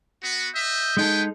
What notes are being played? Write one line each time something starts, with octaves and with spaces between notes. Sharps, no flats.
B3 F#4
D#5 E5 G6
G#3 B3 D#4 G#4 A4 G5